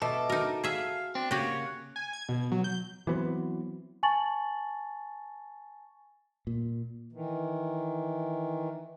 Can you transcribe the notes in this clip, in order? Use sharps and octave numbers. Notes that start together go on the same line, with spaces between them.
B2 A4 B4 D#5 E5 D6
D#4 F#4 A#4
G#4 E5 F5
C4 D4
C#3 A#3 F#4 G4 C#5 F#6 C#7
G#5
G#6
B2
F#3
G6
E3 F#3 B3 C4
G#5 A5 C#6 A6 F#7
A#2
D#3 E3